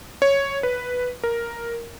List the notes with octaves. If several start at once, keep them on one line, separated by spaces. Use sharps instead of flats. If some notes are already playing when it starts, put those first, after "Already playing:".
C#5
B4
A#4